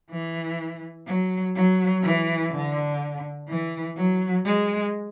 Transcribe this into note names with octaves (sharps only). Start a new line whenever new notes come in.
E3
F#3
F#3
E3
D3
E3
F#3
G#3